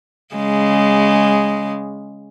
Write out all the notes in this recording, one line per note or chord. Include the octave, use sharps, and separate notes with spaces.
C#3 G#3